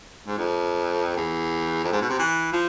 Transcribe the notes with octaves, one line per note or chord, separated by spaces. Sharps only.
G#2
F2
E2
F2
G#2
B2
C3
E3
F3